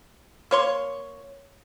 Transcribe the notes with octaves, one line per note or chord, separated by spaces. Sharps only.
A#3 C#5 C6